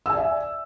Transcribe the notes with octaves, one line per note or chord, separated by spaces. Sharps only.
D5 E5 G#5 E6